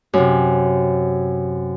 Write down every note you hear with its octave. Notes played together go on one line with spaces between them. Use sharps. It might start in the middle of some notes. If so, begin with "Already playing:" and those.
F#2 C3